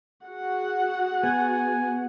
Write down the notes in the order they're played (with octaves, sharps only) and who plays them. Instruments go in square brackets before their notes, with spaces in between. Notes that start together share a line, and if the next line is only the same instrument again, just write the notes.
[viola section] F#4 G#4 F#5
[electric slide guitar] B3 [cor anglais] G#5